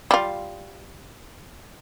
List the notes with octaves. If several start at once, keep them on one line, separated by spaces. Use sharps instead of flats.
G3 F4